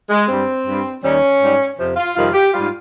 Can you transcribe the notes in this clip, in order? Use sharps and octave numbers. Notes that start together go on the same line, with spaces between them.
G#3
G2 G3 C4
G2 G3
D#2 D#3 G3 C#4
G#2 G3
F2 C3 F3
F4
F2 C3 D#3 G3 F4
G4
G#2 G3 F4